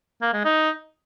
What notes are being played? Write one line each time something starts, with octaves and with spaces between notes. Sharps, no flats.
A#3
G#3
D#4